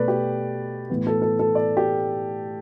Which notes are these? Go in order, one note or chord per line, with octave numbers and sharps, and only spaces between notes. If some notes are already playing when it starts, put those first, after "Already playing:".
Already playing: B2 A3 B4 D5
G4
A2 E3 B3
A4
A4
A4
D5
G4